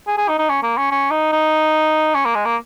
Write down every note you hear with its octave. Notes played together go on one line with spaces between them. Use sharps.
G#4
G#4
D#4
D#4
C#4
A#3
C#4
C#4
D#4
D#4
C#4
A#3
G#3
A#3